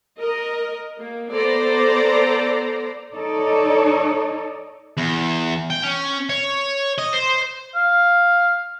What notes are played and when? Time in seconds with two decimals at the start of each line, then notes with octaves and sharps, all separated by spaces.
0.20 A#4 D#5
0.98 A#3
1.32 B3 A4 C5 D5 A#5
3.13 D#4 A4 C#5 D5
4.97 E2
5.70 G5
5.83 C#4
6.29 C#5
6.98 D#5
7.13 C5
7.75 F5